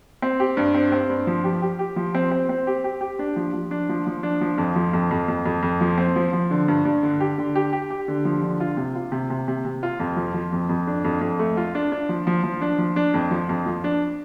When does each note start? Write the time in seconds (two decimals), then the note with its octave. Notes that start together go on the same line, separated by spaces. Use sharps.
0.22 C4
0.40 G4
0.57 G2
0.75 C4
0.92 C4
1.09 G2
1.27 F3
1.44 G4
1.62 G4
1.79 G4
1.96 F3
2.15 C4
2.31 C4
2.49 C4
2.67 G4
2.84 G4
3.01 G4
3.19 D4
3.36 F3
3.54 F3
3.71 D4
3.89 F3
4.07 F3
4.23 D4
4.41 F3
4.58 F2
4.76 F3
4.93 F2
5.11 F2
5.28 F2
5.46 F2
5.63 F2
5.81 F3
5.98 C4
6.16 F3
6.33 F3
6.51 D3
6.68 G2
6.85 G2
7.03 D3
7.20 G4
7.38 D3
7.55 G4
7.73 G4
7.91 G4
8.08 D3
8.25 F3
8.43 D3
8.60 F4
8.77 C3
8.95 F4
9.12 C3
9.30 C3
9.48 C3
9.65 C3
9.83 F4
10.00 F2
10.17 F3
10.34 F3
10.53 F2
10.69 F2
10.87 D4
11.05 F2
11.21 F2
11.39 A3
11.57 F4
11.75 D4
11.92 D4
12.09 F3
12.27 F3
12.44 F3
12.61 D4
12.79 F3
12.96 D4
13.14 F2
13.31 F3
13.49 F2
13.66 F3
13.84 D4